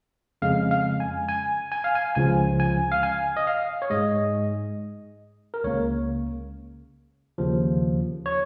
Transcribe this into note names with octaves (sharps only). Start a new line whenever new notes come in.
F2 C#3 G#3 F5
F5
G#5
G#5
G#5
F5
G#5
C#2 C#3 F3 G#5
G#5
F5
G#5
D#5
F5
C#5
G#2 G#3 D#5
A#4
C#2 C#3 A#3 C#5
D#2 C#3 F3
C#5